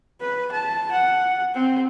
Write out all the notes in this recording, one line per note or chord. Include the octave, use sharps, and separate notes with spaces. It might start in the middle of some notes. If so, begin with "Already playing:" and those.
B4
A5
F#5
C4